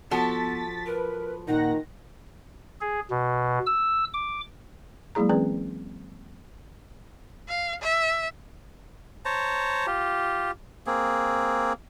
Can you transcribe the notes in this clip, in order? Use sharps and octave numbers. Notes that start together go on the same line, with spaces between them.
F3 B3 F#4 A4 A6 B6
A#4 B4
A#2 D#3 D#4 F#5 A#6
G#4
B2
E6
D6
F#3 G#3 A#3 E4 G#4 A#5
E3 C4 C#4 G#4 B4 D5
F5
E5
C5 C#5 A5 A#5
F4 G4
A#3 C4 G#4